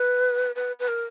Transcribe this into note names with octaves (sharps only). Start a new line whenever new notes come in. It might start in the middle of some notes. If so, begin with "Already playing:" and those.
Already playing: B4
B4
B4
A#4